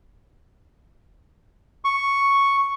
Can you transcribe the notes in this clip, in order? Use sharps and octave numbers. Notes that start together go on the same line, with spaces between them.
C#6